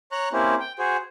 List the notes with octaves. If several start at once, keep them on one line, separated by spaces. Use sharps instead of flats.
C#5 A#5 C#6 F#6
A#3 C4 C#4 E4 G4
G5
F#4 G#4 C5